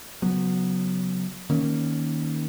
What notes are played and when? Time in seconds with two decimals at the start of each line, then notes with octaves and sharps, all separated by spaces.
0.22 C#3 F#3 B3
1.49 D#3 A#3 C#4